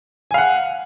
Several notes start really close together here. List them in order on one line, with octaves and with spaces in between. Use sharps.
G#5 F5 F#5